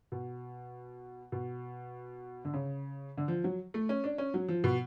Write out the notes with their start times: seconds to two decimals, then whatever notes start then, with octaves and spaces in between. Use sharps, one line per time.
0.12 B2
1.32 B2
2.45 D3
2.54 C#3
3.18 D3
3.28 F3
3.44 F#3
3.74 A3
3.89 C#4
4.04 D4
4.18 C#4
4.34 F#3
4.49 F3
4.64 B2